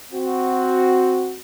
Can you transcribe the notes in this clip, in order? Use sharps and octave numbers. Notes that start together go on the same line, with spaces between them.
C4 F#4